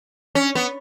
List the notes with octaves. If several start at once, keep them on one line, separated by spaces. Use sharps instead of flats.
C#4
B3